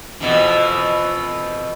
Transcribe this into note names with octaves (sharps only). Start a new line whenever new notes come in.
F2 B2 E3